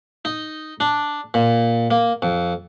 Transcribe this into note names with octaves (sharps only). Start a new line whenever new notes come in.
D#4
D4
A#2
A#3
F2